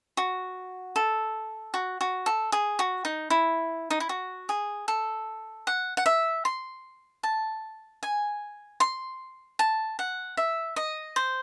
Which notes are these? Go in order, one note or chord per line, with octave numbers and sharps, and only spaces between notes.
F#4
A4
F#4
F#4
A4
G#4
F#4
D#4
E4
D#4
E4
F#4
G#4
A4
F#5
F#5
E5
C6
A5
G#5
C6
A5
F#5
E5
D#5
C5